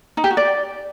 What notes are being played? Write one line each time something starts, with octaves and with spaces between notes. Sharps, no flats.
D#4
G4
F#4
D5